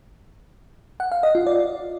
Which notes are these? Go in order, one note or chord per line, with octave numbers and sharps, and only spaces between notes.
F#5
F5
D#5
F4
D5